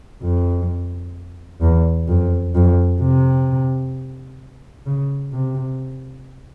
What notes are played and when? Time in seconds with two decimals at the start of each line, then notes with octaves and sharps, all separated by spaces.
0.22 F2
1.61 E2
2.08 F2
2.55 F2
3.01 C3
4.86 C#3
5.32 C3